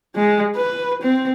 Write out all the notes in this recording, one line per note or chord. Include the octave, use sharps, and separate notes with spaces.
G#3
B4
C4